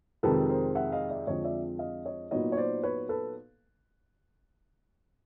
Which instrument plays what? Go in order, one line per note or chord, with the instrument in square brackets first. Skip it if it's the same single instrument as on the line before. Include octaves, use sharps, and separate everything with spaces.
[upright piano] F2 C3 D#3 G#3 A4 B4
A#4 C5
E5 F#5
D#5 F5
D5 E5
F2 D3 F3 G#3 C4 C#5 D#5
D5 E5
D#5 F5
C#5 D#5
A#2 F#3 B3 D#4 C#5 D#5
C#5
C5 D5
B4 C#5
A4 B4